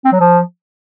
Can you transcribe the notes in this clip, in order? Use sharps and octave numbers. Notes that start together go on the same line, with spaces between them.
C4
F#3
F3